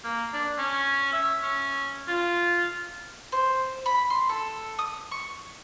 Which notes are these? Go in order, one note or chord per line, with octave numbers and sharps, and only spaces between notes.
A#3
D4
C#4
E5
C#4
F4
C5
B5
C6
A4
D#6
C#6